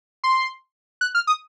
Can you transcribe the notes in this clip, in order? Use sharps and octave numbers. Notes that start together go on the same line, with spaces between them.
C6
F#6
F6
D#6